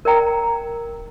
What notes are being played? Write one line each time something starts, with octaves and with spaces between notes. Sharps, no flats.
A#4 D5 G5 A#5